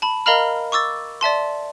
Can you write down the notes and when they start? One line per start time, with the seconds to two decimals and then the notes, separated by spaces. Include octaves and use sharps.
0.02 A5 B5
0.26 A#4 D#5 F5 A#5 B5 F6
0.72 C#6 D6 E6 A6
1.21 D5 E5 A5 C6